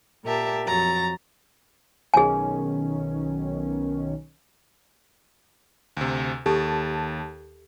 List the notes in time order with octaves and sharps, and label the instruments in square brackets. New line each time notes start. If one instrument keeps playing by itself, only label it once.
[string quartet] A#2 G4 A#4 E5 A5
F2 F#3 A#5 A6
[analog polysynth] B1 D#3 C#4 [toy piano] G#4 G#5
[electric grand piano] D2 C3
[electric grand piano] D#2 A5 [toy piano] G4 A4